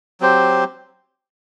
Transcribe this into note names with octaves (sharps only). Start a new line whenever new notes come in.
F#3 C4 G4 C5